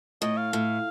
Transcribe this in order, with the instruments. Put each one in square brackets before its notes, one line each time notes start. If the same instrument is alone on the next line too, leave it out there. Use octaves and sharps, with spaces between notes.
[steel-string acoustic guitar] A2 [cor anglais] D#5
[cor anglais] F5
[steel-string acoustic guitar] A2